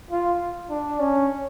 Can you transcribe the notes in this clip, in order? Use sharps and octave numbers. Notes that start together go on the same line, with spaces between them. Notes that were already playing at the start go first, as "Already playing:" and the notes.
F4
D4
C#4